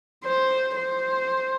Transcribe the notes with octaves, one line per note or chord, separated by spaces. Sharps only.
C5
C5